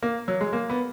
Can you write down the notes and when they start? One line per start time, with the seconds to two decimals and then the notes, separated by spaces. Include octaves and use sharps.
0.03 A#3
0.28 F#3
0.41 G#3
0.53 A#3
0.70 B3